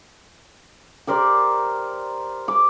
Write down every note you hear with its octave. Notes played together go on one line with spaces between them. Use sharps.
G4 A#4 C5 D5
D6